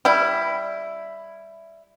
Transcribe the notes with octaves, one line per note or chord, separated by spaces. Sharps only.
G3 E4